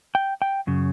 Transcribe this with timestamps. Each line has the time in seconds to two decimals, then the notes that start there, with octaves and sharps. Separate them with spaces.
0.15 G5
0.42 G5
0.67 F#2 C#3